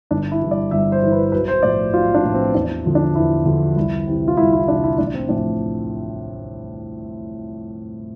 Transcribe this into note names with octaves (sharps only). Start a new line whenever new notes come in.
G1 D4
E4
G2 E3
D5
G1 E5
C5
G2 E3
B4
B1 B4
C5
A2 F3 D5
B1 F4
D4
A2 F3
C4
E2 D4
D3 F3
D4
E2 E4
D3 F3
C2 E4
C3 E3
F4
C2 E4
E4
C3 E3 D4
E4
A1 D4
C4
A2 F3 D4